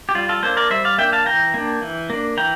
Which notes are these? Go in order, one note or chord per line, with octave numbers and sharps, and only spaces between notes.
G4
G3 F4
F4 A4
A#3 D4 A4 C5
A#4 D5
G3 C5 E5
D5 F5
A#3 D4 E5 G5
F5 A5
E3 G5 A#5
A#3 D4
E3
A#3 D4
E3 G5 A#5